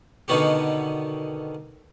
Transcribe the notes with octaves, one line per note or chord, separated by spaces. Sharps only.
B2 D3 D#3 B3 F#4 G4